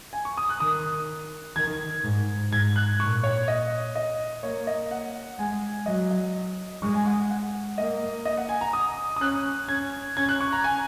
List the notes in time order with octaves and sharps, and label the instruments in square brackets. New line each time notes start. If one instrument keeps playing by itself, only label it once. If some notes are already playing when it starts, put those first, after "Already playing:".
[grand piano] G#5
C#6
D#6
F#6
[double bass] D#3 [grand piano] D#6
[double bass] D#3 [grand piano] G#6
[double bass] G#2
[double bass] G#2 [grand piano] G#6
[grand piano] F#6
[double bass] A#2 [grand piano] C#6
[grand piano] C#5
D#5
D#5
[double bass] A#3 [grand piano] C#5
[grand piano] D#5
F#5
[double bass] G#3 [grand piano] G#5
[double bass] F#3 [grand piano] D#5
[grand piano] D#5
[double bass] G#3 [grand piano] C#6
[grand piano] G#5
F#5
F#5
[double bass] A#3 [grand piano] D#5
[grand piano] D#5
F#5
G#5
A#5
D#6
D#6
[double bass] C#4 [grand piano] F#6
[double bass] C#4 [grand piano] G#6
[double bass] C#4 [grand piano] G#6
[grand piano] F#6
C#6
A#5
G#5